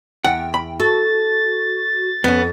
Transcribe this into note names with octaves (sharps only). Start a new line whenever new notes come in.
E2 F#5 G5
B5
F#4 A4 A6
F2 B3 C#4